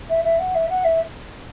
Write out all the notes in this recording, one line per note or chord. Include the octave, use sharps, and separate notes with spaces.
E5
E5
F#5
E5
F#5
E5